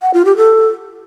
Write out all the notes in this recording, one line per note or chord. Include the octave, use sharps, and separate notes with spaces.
F#5
F4
G4
A4